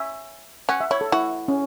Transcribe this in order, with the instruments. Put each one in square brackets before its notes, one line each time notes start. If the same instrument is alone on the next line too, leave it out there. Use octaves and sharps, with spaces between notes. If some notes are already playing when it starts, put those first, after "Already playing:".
Already playing: [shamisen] C#4 [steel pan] E5
[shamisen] C#4 [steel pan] F#5
[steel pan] E5
[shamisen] E4 [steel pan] C#5
[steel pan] A4
[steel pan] E4 [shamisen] F#4
[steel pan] C#4